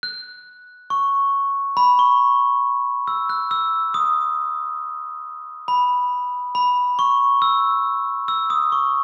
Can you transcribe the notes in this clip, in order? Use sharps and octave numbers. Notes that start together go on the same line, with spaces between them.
F#6
C#6
B5
C#6
E6
F#6
E6
D#6
B5
B5
C#6
E6
E6
D#6
C#6